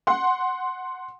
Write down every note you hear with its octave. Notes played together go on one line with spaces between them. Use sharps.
F#5 C6